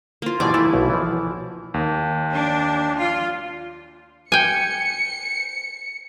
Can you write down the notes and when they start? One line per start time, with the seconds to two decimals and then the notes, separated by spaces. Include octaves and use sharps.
0.22 A#3 F4
0.40 B2 E3 G3 D5 G#5
0.54 E3 A3 E4
0.74 B1 B2
0.90 E3 F3
1.74 D#2
2.33 D4
2.98 F4
4.32 G5 G#5 C#7